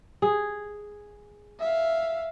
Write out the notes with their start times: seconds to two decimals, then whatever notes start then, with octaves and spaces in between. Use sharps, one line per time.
0.22 G#4
1.60 E5 F5